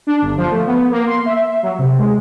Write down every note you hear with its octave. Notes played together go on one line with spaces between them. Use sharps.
D4
G1
F3
A3
B3
A#3
C6
E5
F#3
C3
G#3